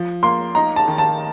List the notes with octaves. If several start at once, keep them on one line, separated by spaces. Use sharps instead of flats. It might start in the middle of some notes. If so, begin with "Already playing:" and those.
Already playing: F3
A#3 C6
D#4 A#5
A5
D#3
A5